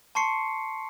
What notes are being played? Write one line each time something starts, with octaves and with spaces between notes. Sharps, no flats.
A5 C6 C#6 C7 C#7